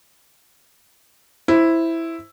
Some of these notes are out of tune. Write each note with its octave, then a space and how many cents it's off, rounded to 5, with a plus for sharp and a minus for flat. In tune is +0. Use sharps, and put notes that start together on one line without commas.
E4 +0 C5 +5